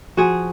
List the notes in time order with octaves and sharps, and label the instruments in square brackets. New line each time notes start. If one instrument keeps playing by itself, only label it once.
[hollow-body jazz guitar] F3 F#4 G#4